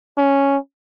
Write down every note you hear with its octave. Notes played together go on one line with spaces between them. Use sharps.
C#4